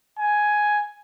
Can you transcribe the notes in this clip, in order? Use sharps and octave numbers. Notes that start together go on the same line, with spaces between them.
G#5